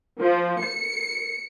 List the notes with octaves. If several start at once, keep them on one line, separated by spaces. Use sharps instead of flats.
F3
C#7